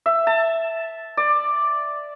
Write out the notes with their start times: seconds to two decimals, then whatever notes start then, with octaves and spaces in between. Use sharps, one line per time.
0.06 E5
0.27 A5
1.17 D5